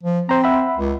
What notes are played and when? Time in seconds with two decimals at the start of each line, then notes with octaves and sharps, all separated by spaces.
0.03 F3
0.29 C4 C5 A#5
0.44 E5 F#5 B5
0.77 C#2